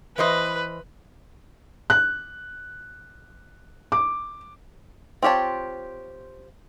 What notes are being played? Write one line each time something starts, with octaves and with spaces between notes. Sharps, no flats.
E3 B4 C5 D#5
F#6
D6
C4 F4 G4 C#5 A5